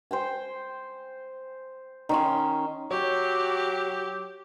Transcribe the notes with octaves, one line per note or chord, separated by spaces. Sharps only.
C5 G5 G#5
D#3 C#4 C6
F#3 G4 C#5